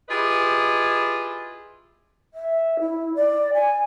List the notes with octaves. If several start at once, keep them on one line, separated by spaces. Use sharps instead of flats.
E4 F4 G4 G#4 B4 D#5
E5
E4
D5
G#5